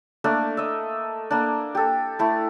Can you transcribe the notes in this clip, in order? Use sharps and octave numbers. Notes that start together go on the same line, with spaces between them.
A3 A#3 D4 A#4
D#5 E5
A#3 D4
G4 A4
A3 E4